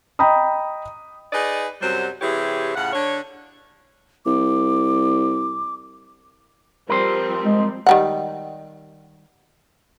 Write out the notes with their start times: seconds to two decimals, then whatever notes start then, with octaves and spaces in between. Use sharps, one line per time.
0.19 D#5 G5 A#5 B5 D#6
1.33 D#4 G#4 B4 D5 D#5
1.81 F#2 C3 F#3 G3 C5
2.22 C3 E3 E4 G4 G#4 C#5
2.75 A2 C#3 F4 F#5
2.93 D3 C#5
4.26 C2 D6
6.89 F3 G3 C4 A#4 C5
7.44 G#3
7.87 D#3 G3 F#5